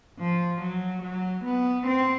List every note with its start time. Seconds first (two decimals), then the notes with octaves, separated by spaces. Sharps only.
0.19 F3
0.61 F#3
1.02 F#3
1.44 B3
1.86 C4